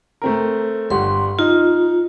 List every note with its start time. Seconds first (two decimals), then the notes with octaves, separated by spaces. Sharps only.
0.22 A3 C4 A#4
0.90 G1 G3 F#5 C6
1.39 D#4 F4